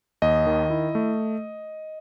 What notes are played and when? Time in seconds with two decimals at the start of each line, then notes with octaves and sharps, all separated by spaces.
0.22 D#2 D#5
0.46 D#3
0.70 E4
0.95 A3